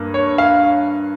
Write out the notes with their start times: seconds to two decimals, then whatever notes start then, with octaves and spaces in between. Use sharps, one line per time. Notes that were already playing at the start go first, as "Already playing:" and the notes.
Already playing: G2 A#3
0.14 C#5
0.38 F5